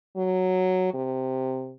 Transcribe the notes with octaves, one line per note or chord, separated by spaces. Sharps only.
F#3
C3